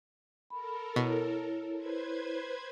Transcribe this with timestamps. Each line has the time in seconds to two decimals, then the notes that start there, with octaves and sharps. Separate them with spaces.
0.50 A4 A#4 B5
0.96 B2 E4 C#5
1.75 B4 C5 G#6